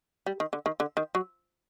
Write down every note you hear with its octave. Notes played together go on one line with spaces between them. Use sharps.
G3
D#3
D3
D#3
D3
D#3
F#3